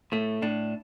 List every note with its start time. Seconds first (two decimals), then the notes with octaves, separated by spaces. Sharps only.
0.12 A2 A3
0.42 A2 D4